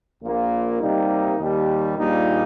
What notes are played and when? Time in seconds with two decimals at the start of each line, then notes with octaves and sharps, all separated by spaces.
0.21 A#1 A#2 A#3
0.80 C3 G3 A#3 D#4
1.38 D#2 D#3 G3
1.97 A#1 A#2 G3 A#3 D#4